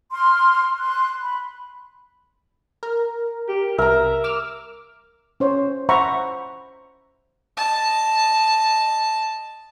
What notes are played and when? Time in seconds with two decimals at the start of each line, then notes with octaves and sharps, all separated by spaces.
0.12 C6 F6
0.78 C6 F#6
1.21 B5
2.83 A#4
3.48 G4
3.78 C2 A#4 E5 A#5
4.24 D6 E6 F6
5.40 C#4 C5 C#5
5.89 C5 E5 F#5 A#5 B5 C#6
7.57 D#5 A5